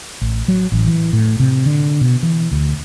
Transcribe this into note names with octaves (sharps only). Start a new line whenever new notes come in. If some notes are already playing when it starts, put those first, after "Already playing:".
A1
F#3
A1
E3
A2
C3
D3
B2
E3
D2